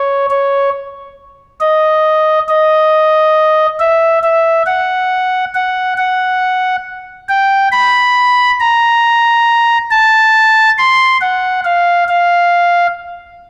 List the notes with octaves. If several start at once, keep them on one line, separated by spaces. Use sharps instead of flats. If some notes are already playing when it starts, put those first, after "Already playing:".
Already playing: C#5
C#5
D#5
D#5
E5
E5
F#5
F#5
F#5
G5
B5
A#5
A5
C6
F#5
F5
F5